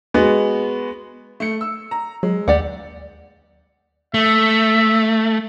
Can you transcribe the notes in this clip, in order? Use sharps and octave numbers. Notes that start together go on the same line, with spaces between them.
G#3 B3 F#4
A3 C#7
E6
A#5
F#3 G#3
D#2 G4 D5 F#5
A3 E5